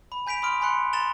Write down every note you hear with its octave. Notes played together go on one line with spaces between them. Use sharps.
B5
G#5 G6 B6 D7 F7
B5 C6 D#6 F6 D7
G#5 B5 C6 F#6 C#7
A#5 C6 A6 E7 F7 G7